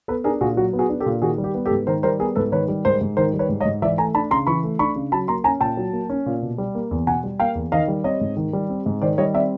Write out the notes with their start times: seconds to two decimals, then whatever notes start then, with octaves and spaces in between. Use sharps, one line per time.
0.08 B3 A4 B4
0.24 D4 G#4 A#4
0.41 A#2 F#4 G#4
0.57 F#3 F#4
0.73 B3
0.79 F#4 G#4
0.89 D4
1.00 G4 A4
1.06 A#2
1.22 D#3 F#4 G#4
1.38 G3
1.44 G4
1.55 B3
1.66 G4 A4
1.71 G#2
1.87 D#3 A#4 C5
2.03 G3 A#4 C5
2.19 B3 G#4 A#4
2.36 G#2 A4 B4
2.52 D#3 B4 C#5
2.68 G3
2.85 G#2 A#4 C5
3.01 G#2
3.17 D#3 A#4 C5
3.33 G3
3.39 B4 C#5
3.49 G#2
3.60 C#5 D#5
3.65 G#2
3.82 E3 D5 E5
3.98 A3 G#5 A#5
4.15 D4 A5 B5
4.31 C#3 A#5 C6
4.47 E3 B5 C#6
4.64 A3
4.79 D4 B5 C#6
4.96 C#3
5.12 F#3 A5 B5
5.28 A#3 A#5 C6
5.44 C#4 G#5 A#5
5.60 A#2 G5 A5
5.77 F#3
5.93 A#3
6.10 C#4
6.26 A#2
6.42 B2
6.58 G3
6.75 A#3
6.91 E2
7.07 B2 F#5 G#5
7.24 G3
7.40 A#3 F5 G5
7.55 E2
7.72 D#3 D#5 F5
7.88 G3
8.04 C4 C#5 D#5
8.21 G#2
8.37 D#3
8.53 G3
8.69 C4
8.86 G#2
9.02 D#3 C5 D5
9.18 G3 C#5 D#5
9.34 C4 D5 E5